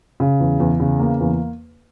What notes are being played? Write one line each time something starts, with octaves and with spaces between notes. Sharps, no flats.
C#3
E2
E2
C#3
A#3
E2